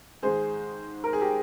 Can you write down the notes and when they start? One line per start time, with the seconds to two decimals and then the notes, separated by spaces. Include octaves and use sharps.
0.23 G#2 D#3 G#3 G#4 C5
1.04 A#4
1.13 G#4
1.21 G4 A#4